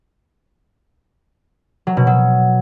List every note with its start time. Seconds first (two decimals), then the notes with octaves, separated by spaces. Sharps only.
1.87 F#3
1.97 B2
2.07 F#3